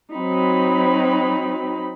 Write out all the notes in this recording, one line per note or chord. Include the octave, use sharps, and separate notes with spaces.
F#3 C4 D#4 B5